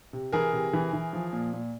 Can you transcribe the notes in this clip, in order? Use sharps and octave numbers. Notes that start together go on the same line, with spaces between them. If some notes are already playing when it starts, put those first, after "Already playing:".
C3
E3 G#4 A#4
C3
E3
E3
F3
A#2
A#2